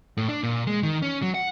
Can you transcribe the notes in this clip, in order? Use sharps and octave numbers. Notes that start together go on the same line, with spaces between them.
A2
D4
A#2
G#3
D#3
C#4
F#3
F#5